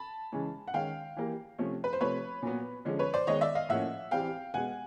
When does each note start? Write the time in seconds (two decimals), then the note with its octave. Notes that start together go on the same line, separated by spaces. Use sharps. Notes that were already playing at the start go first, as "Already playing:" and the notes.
Already playing: A5 B5
0.32 C#3 E3 G#3 C#4
0.68 F#5
0.74 D#3 G#3 C#4 F5 G5
1.17 E3 G3 A#3
1.58 C3 F3 A3 C#4
1.84 B4
1.93 C5
2.00 C3 F3 A3 B4 C#5
2.42 A#2 F#3 B3
2.85 D3 F3 G#3 C#4
2.99 B4 C#5
3.14 C5 D5
3.27 D#3 G#3 B3 C#5 D#5
3.41 D5 E5
3.55 D#5 F5
3.69 A2 F3 A#3 C#4 E5 F#5
4.11 E3 G3 C4 F5 G5
4.54 B2 G#3 B3 F#5 G#5